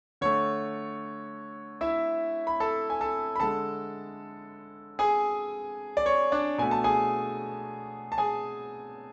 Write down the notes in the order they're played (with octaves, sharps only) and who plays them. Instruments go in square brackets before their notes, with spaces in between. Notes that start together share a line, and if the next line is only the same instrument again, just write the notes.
[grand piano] D3 A3 C#5
E4 E5
B5
A4 A5
G#5
A4 A5
B5
D3 G#3 A4 A5
G#4 G#5
D5
C#5
D4 D5
B2 A3 G#5
A5
G#4 G#5
A5
G#4 G#5